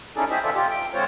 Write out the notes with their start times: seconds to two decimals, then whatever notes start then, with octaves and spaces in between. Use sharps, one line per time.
0.16 C#4 D#4 E4 G#4 A4 D5
0.30 A3 G4 G#4 C5 D#5 E5
0.43 E3 F4 A4 D5 E5
0.55 C3 F4 G4
0.69 G5
0.94 D3 G#3 C4 F4 C5 C#5